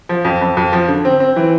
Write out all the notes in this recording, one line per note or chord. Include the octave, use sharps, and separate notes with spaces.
F3
F2
F2
F2
F3
D3
C4
C4
E3